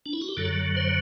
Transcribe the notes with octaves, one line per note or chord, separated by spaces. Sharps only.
D4
E4
F#4
G4
F#2 D3 F#3 A4
C5